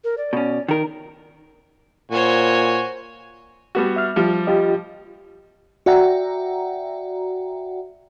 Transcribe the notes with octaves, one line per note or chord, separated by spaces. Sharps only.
A#4
D5
B2 C#4
D#3 A#4
A#2 F#4 C5 C#5 G#5
G3 B3 F#4
E5 F6
F3 G3
F4 G4 D#5
F#4 D5 E5 F#5 G5 A#5